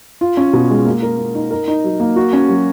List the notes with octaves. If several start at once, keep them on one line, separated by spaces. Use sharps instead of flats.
F4
C#4
B2
G#3
A#3
A#4
A#3
D#4
A#4
D#4
F#3
A#3
F#4
C#4
F#3